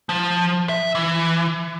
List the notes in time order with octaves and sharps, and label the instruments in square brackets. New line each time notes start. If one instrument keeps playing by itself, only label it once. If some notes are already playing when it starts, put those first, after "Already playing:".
[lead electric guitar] F3
E5
E3